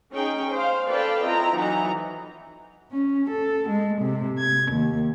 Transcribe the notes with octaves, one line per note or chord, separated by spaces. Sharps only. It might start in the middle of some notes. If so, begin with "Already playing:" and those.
C#4 D#4 G#4 G5
C5 F5
A4 B4 D5 F5 G5 A5
C4 E4 F4 D#5 A#5
E3 F#3 D#4 F#5 A#5
C#4
A4
G#3
C3
G#6
D#2